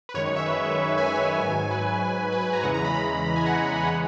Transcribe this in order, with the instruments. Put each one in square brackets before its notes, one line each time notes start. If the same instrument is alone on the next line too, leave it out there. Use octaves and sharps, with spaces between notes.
[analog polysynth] B4
F#2 D#3 G#3 C#5
C#5
E5
B4
B4
G#5
G#5
G#2 F#3
B4
B4
B4
A#5
E2 C#3 E3 G#3 F#5
A#5
B5
A#5
G#5
F#5
E3 G#3